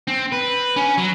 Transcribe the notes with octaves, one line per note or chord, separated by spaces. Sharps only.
C4
B4
C#4
F#3